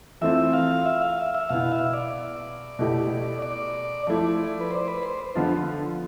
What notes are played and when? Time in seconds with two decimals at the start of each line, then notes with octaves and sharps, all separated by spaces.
0.21 E3 A3 C4 F4 E5
0.53 F5
0.86 E5
1.02 F5
1.18 E5
1.35 E5
1.49 B2 B3 E4 F5
1.72 E5
1.93 D5
2.79 B2 A3 E4 G4
3.42 D5
4.07 F3 A3 E4 D5
4.61 B4
4.71 C5
4.88 B4
5.03 C5
5.35 D3 F3 B3 F4